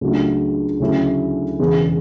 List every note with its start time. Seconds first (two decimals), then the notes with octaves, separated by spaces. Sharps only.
0.01 C#2 C#3 F#3 A3 D4
0.80 D2 C#3 F#3 C#4 E4
1.59 E1 E2 C#3